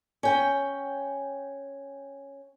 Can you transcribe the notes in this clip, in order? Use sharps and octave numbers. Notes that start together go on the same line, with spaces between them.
C#4 G5